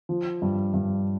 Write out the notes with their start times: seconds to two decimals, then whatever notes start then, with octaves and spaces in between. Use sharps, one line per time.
0.09 F3
0.42 G2
0.74 G2